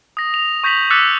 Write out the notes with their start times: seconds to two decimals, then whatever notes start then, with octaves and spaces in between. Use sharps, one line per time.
0.17 D#6 A#6
0.34 F7
0.64 C#6 G6 A#6 B6 F7 F#7
0.90 D6 E6 F#6 A6 B6 C#7